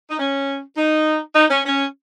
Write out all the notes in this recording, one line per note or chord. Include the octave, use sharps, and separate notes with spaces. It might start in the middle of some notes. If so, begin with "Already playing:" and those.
D#4
C#4
D#4
D#4
C#4
C#4